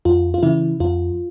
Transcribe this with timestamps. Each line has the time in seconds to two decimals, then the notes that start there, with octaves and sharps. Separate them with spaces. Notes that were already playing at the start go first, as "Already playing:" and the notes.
0.05 F2 F4
0.34 F4
0.43 C#3 E3 E4
0.80 F2 F4